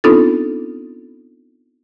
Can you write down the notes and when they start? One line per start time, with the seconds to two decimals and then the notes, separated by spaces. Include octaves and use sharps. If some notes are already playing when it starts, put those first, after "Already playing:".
0.04 B3 C4 D4 D#4 F4 A4